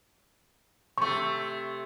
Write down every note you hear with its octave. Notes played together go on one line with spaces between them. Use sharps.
C3 A3 C#6